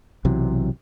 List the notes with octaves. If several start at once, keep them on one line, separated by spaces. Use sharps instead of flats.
B1 C3 E3 F#3